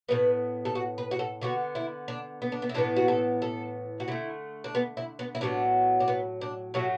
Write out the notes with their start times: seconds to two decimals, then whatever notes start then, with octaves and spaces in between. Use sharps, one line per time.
0.09 A2 E3 B3 B4
0.65 A4
0.75 F#4
0.98 B4
1.11 F#4
1.19 A4
1.41 D3 B3 F#4
1.75 E4
2.08 D4
2.42 B3
2.52 D4
2.62 B3
2.69 E4
2.74 A2 E3 B3 D4
2.96 F#4
3.08 A4
3.42 A4
4.00 F#4
4.08 D3 A3 E4
4.64 D4
4.75 B3
4.97 E4
5.19 B3
5.35 E4
5.41 A2 F#3 B3 D4
6.00 D4
6.08 B3
6.41 D4
6.74 A2 F#3 A3 F#4